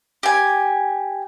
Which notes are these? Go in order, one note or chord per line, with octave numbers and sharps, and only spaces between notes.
G4 G#5